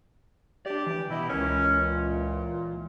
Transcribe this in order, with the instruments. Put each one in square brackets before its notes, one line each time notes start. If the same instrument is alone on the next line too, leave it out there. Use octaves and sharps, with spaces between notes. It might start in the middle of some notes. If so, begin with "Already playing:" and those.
[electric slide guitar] D4 D5 [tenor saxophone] G4
[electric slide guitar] E3
[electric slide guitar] B2 D#5 [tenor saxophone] E4
[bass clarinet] C#2 [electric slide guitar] E3 A#4 [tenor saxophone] C#4
[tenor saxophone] A#2